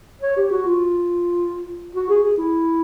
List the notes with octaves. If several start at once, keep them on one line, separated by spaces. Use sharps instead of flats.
C#5
G4
F#4
F4
F#4
G#4
G#4
E4